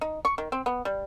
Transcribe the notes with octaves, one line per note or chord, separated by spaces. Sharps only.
D#4
C#6
D#3
C4
B3
G3